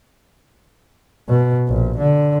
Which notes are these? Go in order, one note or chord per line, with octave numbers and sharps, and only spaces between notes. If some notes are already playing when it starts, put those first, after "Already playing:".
B2
A#1
D3